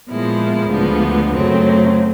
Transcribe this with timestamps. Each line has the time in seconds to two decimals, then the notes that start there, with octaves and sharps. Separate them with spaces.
0.10 A#2 F3 G#3 B3 E4
0.71 D2 D3 F3 G#3 B3
1.33 F#2 C#3 F#3 A3 C4